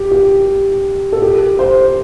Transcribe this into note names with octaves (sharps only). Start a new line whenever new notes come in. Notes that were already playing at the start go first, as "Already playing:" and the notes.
Already playing: G4
G4
A4
G4
C5